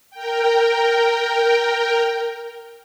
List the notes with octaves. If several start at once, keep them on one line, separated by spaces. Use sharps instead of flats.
A#4 G5